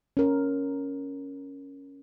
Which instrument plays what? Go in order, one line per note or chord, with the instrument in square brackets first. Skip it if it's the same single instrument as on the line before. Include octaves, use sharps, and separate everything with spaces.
[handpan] C#4 A#4